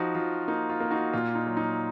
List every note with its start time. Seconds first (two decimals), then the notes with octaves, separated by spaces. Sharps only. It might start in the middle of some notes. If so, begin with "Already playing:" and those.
Already playing: F3 D#4 F#4
0.15 F3 F4
0.48 A#3 D#4
0.70 F4
0.80 A#3
0.91 D#4 F#4
1.13 A#2 F4
1.35 D#4
1.47 F#3
1.57 D#4